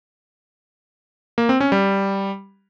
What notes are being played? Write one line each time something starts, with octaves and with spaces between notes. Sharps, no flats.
A#3
C4
C#4
G3